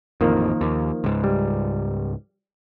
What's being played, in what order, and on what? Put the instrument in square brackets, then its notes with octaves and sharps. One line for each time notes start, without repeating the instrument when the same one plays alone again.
[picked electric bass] A1 F2 [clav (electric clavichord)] D#3 F3 A#3
[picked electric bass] D#2
C#2 G#2
[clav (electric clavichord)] G3